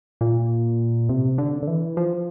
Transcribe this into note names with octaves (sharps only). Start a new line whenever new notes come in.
A#2
C3
D3
D3
E3
F3